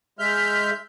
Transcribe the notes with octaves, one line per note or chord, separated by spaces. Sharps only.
G#3 E5 F6 G6